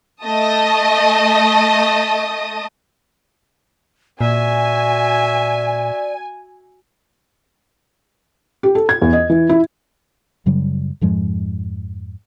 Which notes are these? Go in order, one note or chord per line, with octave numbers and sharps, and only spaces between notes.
A3 D#5 A5 D#6
A#2 F#4 D5 E5 G#5
G4
A4
G#6
E2
D#5
E3
E4
F#2 C#3 F#3 G3
F2 G#2 F3 G#3